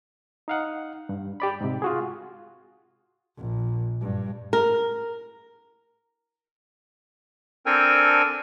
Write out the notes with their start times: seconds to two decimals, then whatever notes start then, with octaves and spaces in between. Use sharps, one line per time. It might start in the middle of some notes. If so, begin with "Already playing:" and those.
0.48 D#4 F5 F#5
1.09 G2
1.40 G4 D5 B5
1.61 G#2 C3
1.82 F4 F#4 G#4
3.37 A#1
4.01 G2
4.53 A#4
7.66 C4 D4 A4 A#4 G5 G#5